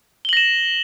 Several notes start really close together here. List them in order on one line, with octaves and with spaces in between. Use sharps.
G7 F#7 A#6 E7